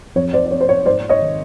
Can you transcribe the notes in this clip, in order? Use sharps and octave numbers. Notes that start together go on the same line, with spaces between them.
F2 C#5
C5 D5
D5
F2 C#5
C5
C#5
G#2 C5 D5
C#5 D#5
D#3